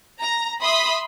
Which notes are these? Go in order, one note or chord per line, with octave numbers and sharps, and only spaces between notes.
A#5
E5 B5 C6 D#6